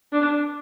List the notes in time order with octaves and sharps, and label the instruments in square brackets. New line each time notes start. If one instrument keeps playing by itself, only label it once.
[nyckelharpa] D4